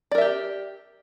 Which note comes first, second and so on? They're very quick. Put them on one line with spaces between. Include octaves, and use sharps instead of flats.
D5 A#4 E5 G4